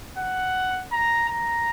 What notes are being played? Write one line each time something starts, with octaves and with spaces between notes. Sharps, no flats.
F#5
A#5
A#5